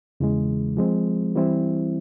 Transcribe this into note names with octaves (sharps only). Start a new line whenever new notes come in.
E2 C#3 E3 G#3
F3 G#3 C4
E3 G3 C4 E4